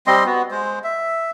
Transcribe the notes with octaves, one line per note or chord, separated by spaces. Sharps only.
G3 C4 D#5 C6
B3 F#4
G#3 C5
E5